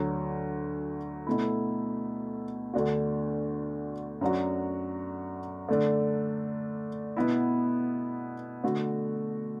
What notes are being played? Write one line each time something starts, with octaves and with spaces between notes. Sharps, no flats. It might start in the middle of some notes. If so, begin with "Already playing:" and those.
Already playing: D2 D3 F#3
B2 A3 E4
D2 D3 A3 D4 F#4
F#2 F#3 D4 F#4
D3 A3 D4
B2 B3 E4
D3 A3 F#4